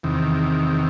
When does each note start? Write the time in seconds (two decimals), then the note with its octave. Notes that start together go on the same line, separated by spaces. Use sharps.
0.03 E2 C3 D#3